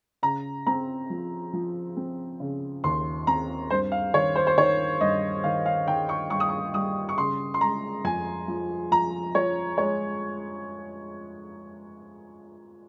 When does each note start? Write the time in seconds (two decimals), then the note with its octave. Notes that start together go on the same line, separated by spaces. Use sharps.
0.23 C#3 A#5
0.67 C4 A#5
1.10 F3
1.53 F3
1.97 C4
2.40 C#3
2.84 D#2 C6
3.27 C4 A#5
3.70 G2 C5
3.92 F5
4.14 D#3 C#5
4.35 C5
4.47 C5
4.58 D#3 C#5
5.01 G2 D#5
5.44 D#3 F5
5.66 F5
5.88 D#3 G5
6.09 C#6
6.30 G2 C#6
6.40 D#6
6.49 C#6
6.74 G3 D#6
7.09 C#6
7.18 C#3 C6
7.54 C6
7.61 G#3 A#5
8.04 F2 G#5
8.48 F3
8.91 F3 A#5
9.35 F3 C#5
9.78 G#3 C#5